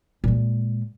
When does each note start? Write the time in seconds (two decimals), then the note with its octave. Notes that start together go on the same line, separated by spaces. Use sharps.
0.24 A#2 G#3